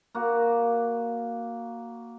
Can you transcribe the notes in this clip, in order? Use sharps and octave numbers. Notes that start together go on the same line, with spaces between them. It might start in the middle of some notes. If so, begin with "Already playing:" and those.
A#3 F#4